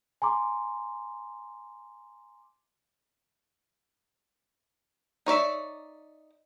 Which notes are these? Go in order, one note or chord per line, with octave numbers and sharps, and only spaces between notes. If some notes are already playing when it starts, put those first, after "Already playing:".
G#5 A#5 C6 D6
D#4 C#5 D5 E5